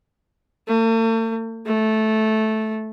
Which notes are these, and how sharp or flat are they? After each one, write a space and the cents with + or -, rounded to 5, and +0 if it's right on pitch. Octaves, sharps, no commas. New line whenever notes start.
A3 +45
A3 -10